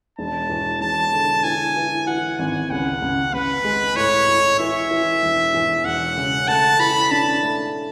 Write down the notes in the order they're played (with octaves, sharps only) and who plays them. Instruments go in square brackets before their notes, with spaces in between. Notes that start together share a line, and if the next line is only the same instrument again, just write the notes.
[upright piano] E1 [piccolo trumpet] A5
[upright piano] E2
[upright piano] E1 [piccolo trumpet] A5
[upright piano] D3
[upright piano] E3 [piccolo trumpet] G#5
[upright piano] E3
[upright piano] E3 [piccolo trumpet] F#5
[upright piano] G#1 [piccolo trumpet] G#5
[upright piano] C#2 [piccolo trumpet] F#5
[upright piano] C#2
[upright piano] C#2 [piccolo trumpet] B4
[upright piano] G#3
[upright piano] A2 [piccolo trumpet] C#5
[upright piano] A2
[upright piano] E3 [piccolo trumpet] E5
[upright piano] E3
E1
E2
[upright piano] E1 [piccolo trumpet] F#5
[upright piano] C#3
[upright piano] A3 [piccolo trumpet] A5
[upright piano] E3 [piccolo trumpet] B5
[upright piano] D4 [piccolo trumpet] A5
[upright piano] A3